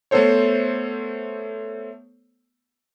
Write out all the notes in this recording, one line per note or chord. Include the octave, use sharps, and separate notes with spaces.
A3 B3 A4 C5 C#5